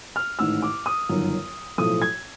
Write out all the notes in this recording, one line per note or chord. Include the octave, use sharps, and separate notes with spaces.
F6
A1 G#2 D#3 E6
D6
D#6
G1 F#2 D#3 F#3
B1 A2 F3 A3 D#6
G#6